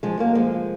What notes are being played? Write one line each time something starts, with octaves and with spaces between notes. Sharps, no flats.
F3 G#3
F#3 A#3
F3 G#3